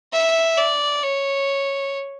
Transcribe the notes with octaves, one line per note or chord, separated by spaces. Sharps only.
E5
D5
C#5